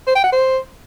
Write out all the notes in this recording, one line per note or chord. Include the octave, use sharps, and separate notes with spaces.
C5
G5
F#5
C5